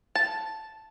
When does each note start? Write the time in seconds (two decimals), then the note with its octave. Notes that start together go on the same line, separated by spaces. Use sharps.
0.15 A5